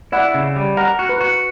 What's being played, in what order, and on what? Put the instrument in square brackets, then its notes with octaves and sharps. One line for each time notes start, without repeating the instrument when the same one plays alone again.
[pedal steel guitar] E4 [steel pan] D5 F#5
[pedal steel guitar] C#3
G3
[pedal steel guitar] A#4 [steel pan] F#5 A#5
[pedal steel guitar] F#4
[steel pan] B4
[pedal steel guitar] F#4